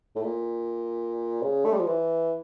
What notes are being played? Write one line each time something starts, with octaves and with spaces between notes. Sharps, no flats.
A2
A#2
C#3
A3
G3
F3
E3